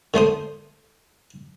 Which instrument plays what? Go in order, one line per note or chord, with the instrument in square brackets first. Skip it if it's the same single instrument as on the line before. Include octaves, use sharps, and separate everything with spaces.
[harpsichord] D3 A3 C5 D#6